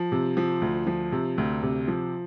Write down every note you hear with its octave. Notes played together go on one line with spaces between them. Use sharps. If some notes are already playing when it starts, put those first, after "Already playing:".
Already playing: F3
C3
F3
D2
F3
C3
D2
C3
F3